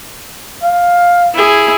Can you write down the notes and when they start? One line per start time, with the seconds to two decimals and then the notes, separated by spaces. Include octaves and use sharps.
0.63 F5
1.35 E4 G#4